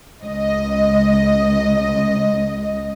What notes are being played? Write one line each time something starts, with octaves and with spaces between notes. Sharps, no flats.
C#2 D#5